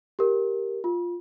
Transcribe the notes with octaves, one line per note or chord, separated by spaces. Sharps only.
G4 A#4
F4